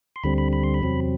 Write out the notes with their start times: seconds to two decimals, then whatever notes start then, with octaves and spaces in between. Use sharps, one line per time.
0.16 C6
0.24 D2 D3 G3 C4 B5
0.38 B5
0.53 B5
0.64 C6
0.74 B5
0.82 E2 C3 F#3 C4